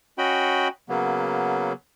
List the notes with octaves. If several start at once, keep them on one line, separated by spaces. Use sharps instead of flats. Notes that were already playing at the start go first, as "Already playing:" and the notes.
C#4 F#4 D#5 G5 B5
C#3 F#3 A#3 B3